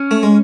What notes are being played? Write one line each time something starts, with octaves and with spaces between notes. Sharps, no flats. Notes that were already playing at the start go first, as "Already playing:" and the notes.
Already playing: C#4
A3
G#3